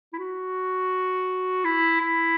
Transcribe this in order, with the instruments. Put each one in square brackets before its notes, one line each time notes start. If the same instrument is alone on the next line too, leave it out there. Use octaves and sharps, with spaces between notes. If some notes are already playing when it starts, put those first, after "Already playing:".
[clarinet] E4
F#4
E4
E4